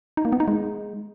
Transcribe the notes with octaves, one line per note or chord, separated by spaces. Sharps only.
D#4
A#3
B3
D#4
G#3